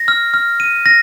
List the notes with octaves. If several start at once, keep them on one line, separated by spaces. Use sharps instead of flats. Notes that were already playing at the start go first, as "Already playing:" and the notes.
Already playing: A#6
F6
F6
D#7
A#6